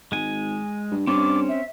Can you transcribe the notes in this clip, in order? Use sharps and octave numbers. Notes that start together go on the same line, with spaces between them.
G#1 G#3 G#5
G2
G2 C4 C#4 D6
E5